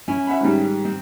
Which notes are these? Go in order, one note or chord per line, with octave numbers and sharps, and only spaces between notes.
C#4 E4 G#5
E5 F#5 B5
G#2 D#3 G3
C4